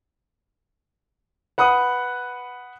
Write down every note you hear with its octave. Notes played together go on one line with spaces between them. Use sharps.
B4 F#5 B5 D#6